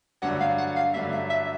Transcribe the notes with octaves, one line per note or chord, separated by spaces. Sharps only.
G2 D3 F#3 A3 D4 F#5
F5
F#5
F5
G2 D3 F#3 A3 D4 E5
E5
E5